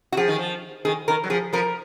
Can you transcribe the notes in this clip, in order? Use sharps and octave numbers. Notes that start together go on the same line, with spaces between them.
F#4
F3 G#4
D#3
F3
D#3 G#4
D#3 A#4
F#3
F3 G#4
F3 A#4